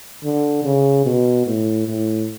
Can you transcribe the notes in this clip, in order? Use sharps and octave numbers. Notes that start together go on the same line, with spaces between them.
D3
C#3
B2
A2
A2